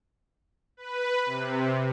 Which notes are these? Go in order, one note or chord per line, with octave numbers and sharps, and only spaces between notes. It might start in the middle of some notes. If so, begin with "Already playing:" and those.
B4
C3